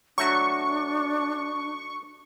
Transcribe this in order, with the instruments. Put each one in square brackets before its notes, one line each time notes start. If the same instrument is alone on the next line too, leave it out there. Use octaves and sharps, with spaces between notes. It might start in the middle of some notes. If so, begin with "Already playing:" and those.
[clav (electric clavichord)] F#3 A3 F#4 [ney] D4 [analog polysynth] C#6